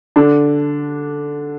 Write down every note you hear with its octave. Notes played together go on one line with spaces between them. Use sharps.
D3 D4